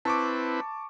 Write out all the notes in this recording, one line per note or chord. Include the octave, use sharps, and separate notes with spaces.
C4 E4 B4 A5 C#6 D6